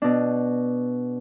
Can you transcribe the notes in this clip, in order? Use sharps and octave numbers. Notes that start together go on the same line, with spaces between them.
B2 D4